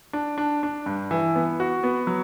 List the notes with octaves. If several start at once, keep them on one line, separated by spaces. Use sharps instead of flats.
D4
D4
D4
G2
E3
B3
F#4
B3
F#3